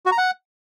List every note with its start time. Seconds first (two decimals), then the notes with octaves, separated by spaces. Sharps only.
0.06 F#4
0.12 A#5
0.18 F#5